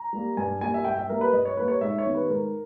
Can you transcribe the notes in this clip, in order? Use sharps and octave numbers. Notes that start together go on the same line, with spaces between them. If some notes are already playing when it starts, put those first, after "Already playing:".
Already playing: A#5
G3 A#3
G2 G#5
G3 A#3 G#5
E5
G2 G5
E5
G3 A#3 A#4
B4
G2 D#5
C#5
G3 A#3 B4
C#5
G#2 E5
C#5
D#3 G3 B3
B4
G#2 A#4